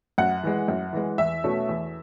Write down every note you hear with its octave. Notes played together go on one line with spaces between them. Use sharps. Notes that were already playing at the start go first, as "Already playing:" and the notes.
F#2 F#5
E3 G#3
F#2
E3 G#3
E2 E5
B2 A3 C#4
E2